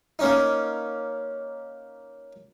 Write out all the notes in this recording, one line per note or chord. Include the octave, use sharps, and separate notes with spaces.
A#3 C#4 D#4